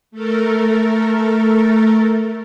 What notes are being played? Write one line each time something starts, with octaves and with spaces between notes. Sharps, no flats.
A3 A4 A#4